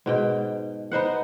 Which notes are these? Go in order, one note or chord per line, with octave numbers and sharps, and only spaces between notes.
G#2 B2 G5
B3 D#4 C5 F#5